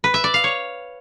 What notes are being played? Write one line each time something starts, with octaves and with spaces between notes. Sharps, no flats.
B4
E5
D5
F5
C#5